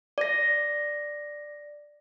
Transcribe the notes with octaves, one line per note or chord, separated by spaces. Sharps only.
D5 A#6